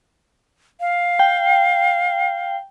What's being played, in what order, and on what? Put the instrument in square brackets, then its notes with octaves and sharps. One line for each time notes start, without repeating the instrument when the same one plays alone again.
[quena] F5
[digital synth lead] G5